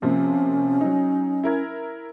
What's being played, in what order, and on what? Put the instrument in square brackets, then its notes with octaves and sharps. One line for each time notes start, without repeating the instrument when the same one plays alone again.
[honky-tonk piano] C3 F3 A#3 [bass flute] C#4
[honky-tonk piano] F#3 D#4
E4 A#4 G#6